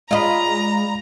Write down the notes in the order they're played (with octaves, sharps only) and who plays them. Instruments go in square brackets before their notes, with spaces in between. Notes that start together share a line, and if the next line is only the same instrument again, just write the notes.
[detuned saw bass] G#3 [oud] F4 D#5 [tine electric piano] D5 F5 B5 [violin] A#5